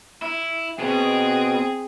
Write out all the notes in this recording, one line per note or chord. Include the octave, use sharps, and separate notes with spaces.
E4
B2 C4 G#4